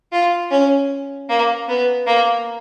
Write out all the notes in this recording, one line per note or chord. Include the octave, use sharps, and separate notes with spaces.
F4
C#4
A#3
B3
A#3